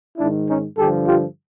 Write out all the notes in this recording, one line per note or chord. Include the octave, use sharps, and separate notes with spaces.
G#2 D#3 D4 E4
C#4 D#4
G2 D3 F3 G4 A4
F4 G4